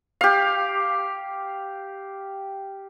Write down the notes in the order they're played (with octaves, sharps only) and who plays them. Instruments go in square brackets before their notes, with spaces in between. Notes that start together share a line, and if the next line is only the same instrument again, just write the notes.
[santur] G4 F5